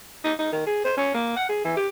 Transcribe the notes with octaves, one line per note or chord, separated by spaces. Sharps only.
D#4
D#4
D#3
G#4
C5
C#4
A#3
F#5
G#4
E3
G4